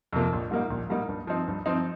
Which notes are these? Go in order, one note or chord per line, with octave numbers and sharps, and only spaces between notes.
F2 C3 F3 A#3
A#1
G#2 G3 A#3 D#4
A#1
G#2 G3 A#3 D#4
G2
F3 C4 D#4
G2
F3 C4 D#4